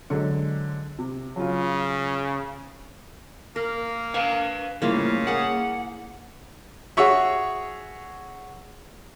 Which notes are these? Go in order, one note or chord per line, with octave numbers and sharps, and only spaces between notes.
D3 F#3 G#3
C3
C#3 F#3 F4
A#3 A#4
B4 F5 G#5
A2 C#3 G3 A#3 E4 F4
A#3 G#4 F#5
F#4 G#4 C#5 E5